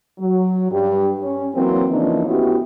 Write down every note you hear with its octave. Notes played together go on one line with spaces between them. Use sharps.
F#3
G2 G4
C#4
E3 F#3 A#3 C4
C#3 E3 F3 A#3 D4 D#4
A2 B3 C#4 E4 F#4 G4